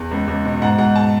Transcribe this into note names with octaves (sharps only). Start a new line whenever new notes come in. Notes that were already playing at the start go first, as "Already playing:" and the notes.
Already playing: E2
C#2
C#2
B2
G#2 F#5
G#2 F#5
A5